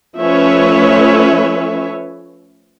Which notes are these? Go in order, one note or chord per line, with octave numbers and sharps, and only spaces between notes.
F3 A3 C#4 B4 C#5 E5